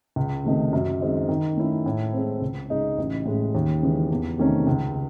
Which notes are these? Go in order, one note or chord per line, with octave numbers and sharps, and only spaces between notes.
C#2
C3 D#3 A3 D#4
F#2
D#3 G#3 C4 D#4
D#3
A3 C#4 E4
A2
G#3 C4
C#2
C#3 G#3 D#4
A1
A2 G#3
D#2
C#3 E3 G#3
E2
C3 D#3 A3 C#4
C#2